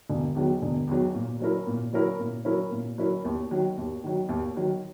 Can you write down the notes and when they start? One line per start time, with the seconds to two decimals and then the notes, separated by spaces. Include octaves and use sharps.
0.10 E1
0.35 E2 D#3 F#3
0.62 E1
0.88 E2 D#3 F#3
1.15 A#2
1.40 F#3 C#4 E4 A#4
1.67 A#2
1.93 F#3 C#4 E4 A#4
2.19 A#2
2.45 F#3 C#4 E4 A#4
2.71 A#2
2.98 F#3 C#4 E4 A#4
3.25 D#2
3.51 D#3 F#3
3.77 D#2
4.04 D#3 F#3
4.29 D#2
4.56 D#3 F#3